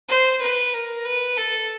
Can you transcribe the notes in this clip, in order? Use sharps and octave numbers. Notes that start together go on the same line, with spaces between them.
C5
B4
A#4
B4
A4